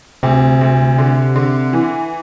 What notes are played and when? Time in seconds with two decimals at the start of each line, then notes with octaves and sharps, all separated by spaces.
0.23 D2 C3
0.61 D2
0.98 D3
1.36 D3
1.73 E3